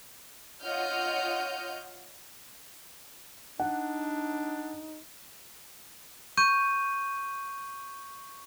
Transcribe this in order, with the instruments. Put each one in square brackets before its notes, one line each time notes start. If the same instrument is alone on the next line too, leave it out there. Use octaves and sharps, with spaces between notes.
[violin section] F4 C#5 D#5 F#5 F6 G6
[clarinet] D4 [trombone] D#4 [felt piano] F#5
[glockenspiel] C#6 G6 D#7